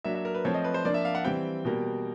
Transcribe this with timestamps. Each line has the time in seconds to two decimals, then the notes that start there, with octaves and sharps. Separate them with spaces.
0.04 F#3 A#3 D4 E5
0.15 E5
0.25 A#4
0.35 B4
0.45 F3 A3 C4 C#5
0.54 D#5
0.64 B4
0.74 C5
0.85 F3 A#3 D4 D5
0.94 E5
1.05 F5
1.15 F#5
1.25 E3 G3 C4 G5
1.65 B2 G3 A#3